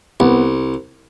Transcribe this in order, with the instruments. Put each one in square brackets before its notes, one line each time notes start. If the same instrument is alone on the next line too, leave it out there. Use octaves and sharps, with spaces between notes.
[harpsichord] C2 [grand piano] B3